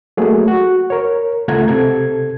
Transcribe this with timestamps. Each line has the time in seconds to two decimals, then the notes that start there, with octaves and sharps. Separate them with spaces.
0.17 F#3 A3 A#3 G#4
0.48 F#4
0.90 A#4 C#5
1.48 C#2 A3 F4 F#5 A#5 G#6
1.68 C3 A4 G#6